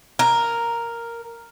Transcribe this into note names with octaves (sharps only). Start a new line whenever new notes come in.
A#4